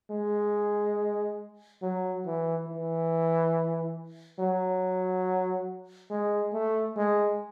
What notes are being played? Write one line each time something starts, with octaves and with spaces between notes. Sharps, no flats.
G#3
F#3
E3
E3
F#3
G#3
A3
G#3